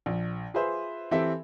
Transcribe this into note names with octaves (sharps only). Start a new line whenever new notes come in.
A#1
F4 G#4 B4 C5 E5
E3 C4 G4 A4 E5